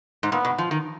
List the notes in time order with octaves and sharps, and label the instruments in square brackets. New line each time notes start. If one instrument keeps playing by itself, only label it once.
[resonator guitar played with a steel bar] G#2
[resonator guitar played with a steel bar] A#2 [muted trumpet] B3
[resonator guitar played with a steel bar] B2
F3
D#3